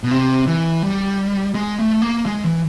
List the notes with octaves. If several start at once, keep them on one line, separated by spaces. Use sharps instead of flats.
B2
C3
E3
G3
G#3
A3
A#3
G#3
E3